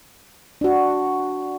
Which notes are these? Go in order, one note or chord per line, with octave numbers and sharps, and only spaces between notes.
D4 F#4